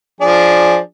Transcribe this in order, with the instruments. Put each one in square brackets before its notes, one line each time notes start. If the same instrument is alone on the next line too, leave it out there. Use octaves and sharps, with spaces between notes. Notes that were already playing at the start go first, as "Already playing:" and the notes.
[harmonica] F3 D4 G#4